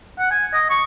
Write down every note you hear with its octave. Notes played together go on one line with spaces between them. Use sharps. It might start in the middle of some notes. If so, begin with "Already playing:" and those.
F#5
G#5
D#5
C#6